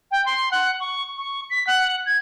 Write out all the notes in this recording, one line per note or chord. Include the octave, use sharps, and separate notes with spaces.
G5
C6
F#5
C#6
C#6
B6
F#5
G#6